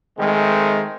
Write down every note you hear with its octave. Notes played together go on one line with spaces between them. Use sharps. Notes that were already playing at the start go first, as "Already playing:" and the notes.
D#3 G#3 A3 C4